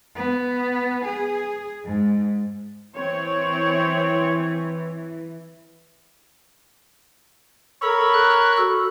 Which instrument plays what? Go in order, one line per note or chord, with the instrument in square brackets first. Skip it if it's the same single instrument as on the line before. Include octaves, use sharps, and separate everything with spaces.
[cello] B3
G#4
G#2
[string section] E3 [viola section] C4 C#5
[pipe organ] A4 [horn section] A#4 C#5 B5
[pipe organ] F#6
F#4 A4